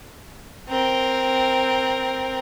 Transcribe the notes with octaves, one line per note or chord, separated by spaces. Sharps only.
C4 A#4